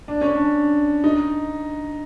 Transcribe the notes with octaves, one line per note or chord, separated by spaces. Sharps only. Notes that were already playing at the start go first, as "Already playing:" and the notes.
D4
C#4
D4
D#4